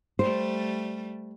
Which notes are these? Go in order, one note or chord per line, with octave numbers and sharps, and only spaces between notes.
G3 A3 C5